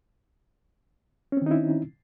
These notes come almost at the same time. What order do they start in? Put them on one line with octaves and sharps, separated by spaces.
C#4 C4 D#3 D#4 E4